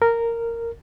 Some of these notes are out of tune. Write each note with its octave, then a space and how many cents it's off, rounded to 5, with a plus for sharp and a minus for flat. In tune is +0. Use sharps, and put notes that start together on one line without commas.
A#4 -10